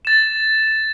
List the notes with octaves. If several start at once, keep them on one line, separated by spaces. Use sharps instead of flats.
A6 E7